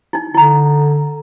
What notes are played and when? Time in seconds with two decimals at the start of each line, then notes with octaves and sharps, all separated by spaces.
0.13 D#4 E4
0.34 D3 E4 A#5